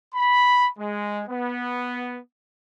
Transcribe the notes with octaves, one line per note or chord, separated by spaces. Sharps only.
B5
G#3
B3